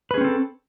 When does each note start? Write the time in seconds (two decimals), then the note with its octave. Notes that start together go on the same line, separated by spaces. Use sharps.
0.11 B4
0.14 G#4
0.18 C#4
0.21 C4
0.24 A4